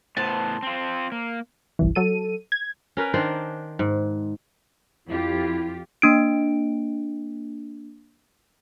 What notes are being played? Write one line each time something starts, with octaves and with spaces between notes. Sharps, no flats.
A2 B3 C5 A5
C4 F4
A#3
G1 C2 E3
F#3 A4 D#7
G#6
C#4 A#4 B4
D#3 D4 C5 D5
G#2
F2 E4 F4 G4
A#3 D4 D7